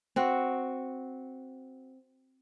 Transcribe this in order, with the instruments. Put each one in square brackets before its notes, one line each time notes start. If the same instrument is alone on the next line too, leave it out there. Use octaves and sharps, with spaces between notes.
[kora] C4 F#4